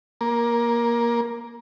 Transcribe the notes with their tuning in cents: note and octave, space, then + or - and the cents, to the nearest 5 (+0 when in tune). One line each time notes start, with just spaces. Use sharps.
A#3 +15